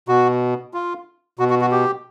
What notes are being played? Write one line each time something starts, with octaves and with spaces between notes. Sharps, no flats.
B2 F#4
F4
B2 F#4
F#4
F#4
G4